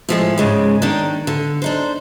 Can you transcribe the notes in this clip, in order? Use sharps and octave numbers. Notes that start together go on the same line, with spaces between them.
A2 F3 G#3
G#2 C#3 G#3
D#3 A#3 D4
D3
D4 D#4 C5